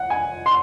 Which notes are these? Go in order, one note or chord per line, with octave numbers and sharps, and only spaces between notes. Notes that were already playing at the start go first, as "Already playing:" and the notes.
Already playing: F#5
G#5
C6